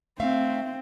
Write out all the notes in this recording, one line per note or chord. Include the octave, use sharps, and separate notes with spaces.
A3 C4 E5 F5